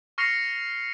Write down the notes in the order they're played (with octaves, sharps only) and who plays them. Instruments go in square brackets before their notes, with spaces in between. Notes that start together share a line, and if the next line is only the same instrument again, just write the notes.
[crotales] C#6 F6 A#6 C7 C#7 F7